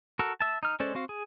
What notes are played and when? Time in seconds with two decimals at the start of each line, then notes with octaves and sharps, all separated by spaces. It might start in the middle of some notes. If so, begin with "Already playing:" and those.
0.19 F#4 A4 A#4
0.41 E5 A5
0.63 D#4 F6
0.80 G#3 C#4 A4 C5 D5
0.95 C4 F#4 F5
1.09 G#4